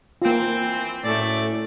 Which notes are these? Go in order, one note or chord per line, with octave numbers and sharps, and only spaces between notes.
E3 A#3 C4 F4
F#2 A2 A3 D5